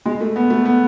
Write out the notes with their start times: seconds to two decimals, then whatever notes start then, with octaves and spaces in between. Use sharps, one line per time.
0.06 G#3
0.20 A3
0.36 B3
0.50 A3
0.65 B3